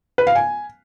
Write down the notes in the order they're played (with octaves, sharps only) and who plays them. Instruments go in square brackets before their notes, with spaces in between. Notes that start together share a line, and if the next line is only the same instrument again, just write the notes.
[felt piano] B4
F5
G#5